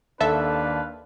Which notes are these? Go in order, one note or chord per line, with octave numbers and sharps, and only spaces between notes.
D#2 D4 A4 B4 E5 F5 A5